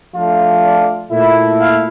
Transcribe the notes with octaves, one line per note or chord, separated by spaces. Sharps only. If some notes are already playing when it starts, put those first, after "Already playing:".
F3 A3 D4 F4
D5
A#2 A3 E4 E5
F5